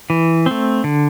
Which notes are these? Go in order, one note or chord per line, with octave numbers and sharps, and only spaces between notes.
E3
A3 C4
D3